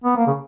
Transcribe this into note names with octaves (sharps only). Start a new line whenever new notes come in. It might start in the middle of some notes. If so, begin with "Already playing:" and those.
B3
A#3
C#3